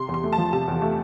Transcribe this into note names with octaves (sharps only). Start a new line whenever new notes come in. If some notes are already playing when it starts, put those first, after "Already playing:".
Already playing: C3 C6
E2
C6
A3
A5
F3
C3 A5
E2
A3